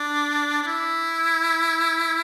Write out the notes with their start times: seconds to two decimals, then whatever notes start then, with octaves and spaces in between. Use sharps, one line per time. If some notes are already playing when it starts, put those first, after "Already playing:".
Already playing: D4
0.63 D4
0.67 E4